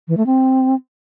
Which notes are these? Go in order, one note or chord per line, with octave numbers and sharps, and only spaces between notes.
E3
A3
C4